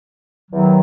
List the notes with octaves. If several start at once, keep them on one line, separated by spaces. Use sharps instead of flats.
E2 D#3 F#3